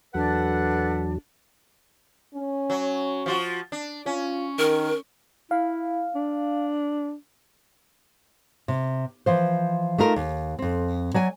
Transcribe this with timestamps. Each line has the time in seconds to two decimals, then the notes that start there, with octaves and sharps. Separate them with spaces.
0.14 E2 F#3 D4 A4 B4 F#5
2.35 C#4
2.70 F#3
3.26 F3 F4 F#4
3.72 D4
4.06 C#4 F4
4.59 D#3 A#4
5.51 E4 F5
6.15 D4
8.68 C3
9.26 E3 F3 C5
9.98 A3 D#4 F4 A#4
10.16 D#2
10.59 F2 C4
11.14 F#3 D5 G#5